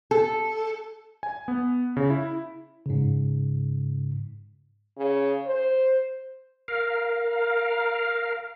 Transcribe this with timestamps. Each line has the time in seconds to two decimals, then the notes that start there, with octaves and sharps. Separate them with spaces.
0.11 A4
1.23 G#5
1.48 B3
1.97 C#3
2.10 E4
2.86 G#2 C#3
4.98 C#3
5.46 C5
6.68 A#4 F5